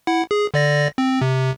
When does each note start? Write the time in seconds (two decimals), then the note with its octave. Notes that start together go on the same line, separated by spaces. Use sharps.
0.07 E4 F#5
0.31 G#4
0.54 D3 D5 A#6
0.98 C4
1.21 C3